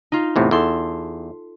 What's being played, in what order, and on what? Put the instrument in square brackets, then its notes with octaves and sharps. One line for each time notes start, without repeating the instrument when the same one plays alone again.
[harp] D#4 F4
[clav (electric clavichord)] E2 A2 C3
[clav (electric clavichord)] E2 [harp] A4 C6